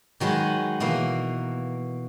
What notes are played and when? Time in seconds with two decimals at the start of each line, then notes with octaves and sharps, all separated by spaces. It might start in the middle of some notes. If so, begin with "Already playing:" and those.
0.20 D#3 F#3 G#3 B4
0.80 B2 E3 A#3